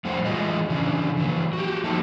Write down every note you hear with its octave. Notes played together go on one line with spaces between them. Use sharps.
F2 A2 G3 A4 C5 F#5
E3 G#3 A3 F4 G#4 D#5
C#3 E3 C#4 D4
E3 F#3 A#3
F#4 G4
F3 G3 A3 A#3 D#4 A4